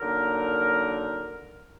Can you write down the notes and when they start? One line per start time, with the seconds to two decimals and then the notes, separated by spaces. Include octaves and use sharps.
0.01 D3 F#3 A#3 D#4 A#4